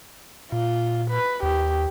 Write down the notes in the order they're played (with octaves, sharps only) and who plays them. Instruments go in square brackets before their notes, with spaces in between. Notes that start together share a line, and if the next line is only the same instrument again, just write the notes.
[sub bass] A#2 [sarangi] F4
[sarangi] B4
[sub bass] D#2 [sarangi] G4